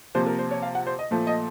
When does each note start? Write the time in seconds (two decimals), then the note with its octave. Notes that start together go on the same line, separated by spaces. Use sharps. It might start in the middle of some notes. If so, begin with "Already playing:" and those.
0.15 C3 F3 A#3 C5
0.27 A#4
0.39 C5
0.51 C#5
0.62 F5
0.75 F#5
0.87 C5
0.99 D#5
1.11 A#2 F3 A3
1.27 D#5